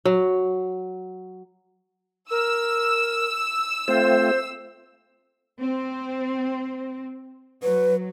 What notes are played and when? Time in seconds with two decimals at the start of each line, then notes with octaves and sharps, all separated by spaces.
0.05 F#3
2.31 A#4 E6
3.88 A3 C4 F4 C5
5.59 C4
7.63 F#3 B4